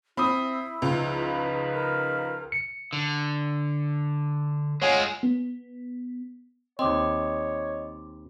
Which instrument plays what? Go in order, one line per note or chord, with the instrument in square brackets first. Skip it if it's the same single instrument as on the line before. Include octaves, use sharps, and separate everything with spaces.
[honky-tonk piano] C4 [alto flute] E4 [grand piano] B5 D#6
[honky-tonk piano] C#2 [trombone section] F3 D#4 B4
[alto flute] A#4
[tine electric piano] C#7
[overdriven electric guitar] D3
[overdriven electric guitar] G#3 F4 [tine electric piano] C#5 F#5 G#5
[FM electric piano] B3
[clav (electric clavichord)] D#2 C4 [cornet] C#5 [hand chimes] D#5 [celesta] C6 D6